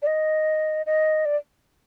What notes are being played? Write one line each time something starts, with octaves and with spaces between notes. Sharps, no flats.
D5
D#5
D#5
D5